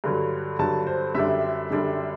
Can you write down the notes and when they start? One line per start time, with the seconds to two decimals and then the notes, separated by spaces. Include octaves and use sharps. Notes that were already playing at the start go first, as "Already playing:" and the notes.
0.04 G2 D3 F#3
0.59 G2 D3 F#3 A5
0.87 C5
1.15 F#2 D3 G3 D4 E5
1.70 F#2 D3 G3 D4